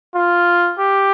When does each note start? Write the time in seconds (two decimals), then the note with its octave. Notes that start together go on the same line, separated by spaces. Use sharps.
0.16 F4
0.79 G4